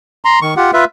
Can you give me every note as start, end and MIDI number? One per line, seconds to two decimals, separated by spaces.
0.25 0.39 82
0.25 0.39 84
0.42 0.54 51
0.42 0.54 85
0.57 0.71 65
0.57 0.71 67
0.57 0.71 78
0.73 0.85 65
0.73 0.85 71
0.73 0.85 76